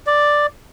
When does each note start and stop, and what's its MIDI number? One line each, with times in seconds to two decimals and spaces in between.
0.07 0.46 74